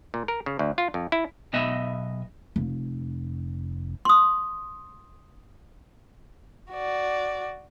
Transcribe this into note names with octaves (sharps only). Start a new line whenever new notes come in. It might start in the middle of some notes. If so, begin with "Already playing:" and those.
A#2
A#4
C#3
D2
F4
F2
E4
B1 B3 D#5 E5
F1
C6 D#6
F#4 D5